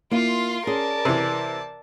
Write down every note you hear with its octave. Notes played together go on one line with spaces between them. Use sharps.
A#3 E4 F4 C6
C#4 G#4 A#4 D5 A5
C3 E3